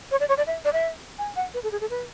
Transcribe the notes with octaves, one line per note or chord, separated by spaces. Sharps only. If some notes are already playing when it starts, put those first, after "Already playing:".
C#5
D5
C#5
D5
E5
D5
E5
G#5
F#5
B4
A4
G#4
A4
B4